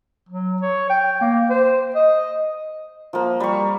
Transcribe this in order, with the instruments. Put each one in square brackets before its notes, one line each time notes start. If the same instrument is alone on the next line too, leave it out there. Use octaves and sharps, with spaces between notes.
[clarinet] F#3
C#5
G5
A#3
C5
D#5
[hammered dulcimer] F3 A#3
G3 C#6